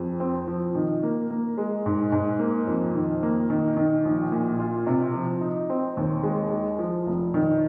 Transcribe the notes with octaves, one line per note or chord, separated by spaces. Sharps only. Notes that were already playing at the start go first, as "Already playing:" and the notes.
Already playing: F2 G#4
C4
F3
D#3
A#3
A#3
G#3
G#2
G#2
A#3
F2
D#3
A#3
D#3
D#3
A#1
A#2
F4
C3
F3
D#4
C4
D#2
G#3
G#3
F3
F1
D#3